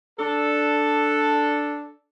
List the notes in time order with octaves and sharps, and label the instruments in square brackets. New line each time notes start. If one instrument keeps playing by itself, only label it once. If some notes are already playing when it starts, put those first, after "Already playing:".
[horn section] D4 A4